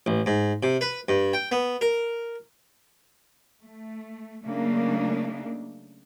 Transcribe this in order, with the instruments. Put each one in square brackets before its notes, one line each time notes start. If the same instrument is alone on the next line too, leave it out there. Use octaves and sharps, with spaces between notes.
[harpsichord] A1
G#2
C3
B4
G2
G5
B3
A#4
[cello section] A3
C#3 F#3 A3 A#3 D4 D#4